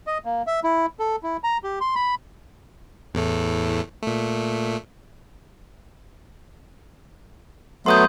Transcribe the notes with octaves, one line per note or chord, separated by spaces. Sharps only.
D#5
A#3
E5
E4
A4
E4
A#5
G4
C6
B5
E2 A2 A3
A#2 A3
F#3 A3 B3 C6 D#6 G6